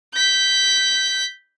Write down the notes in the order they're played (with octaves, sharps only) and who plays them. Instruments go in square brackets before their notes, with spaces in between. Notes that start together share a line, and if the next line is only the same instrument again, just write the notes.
[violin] G6 B6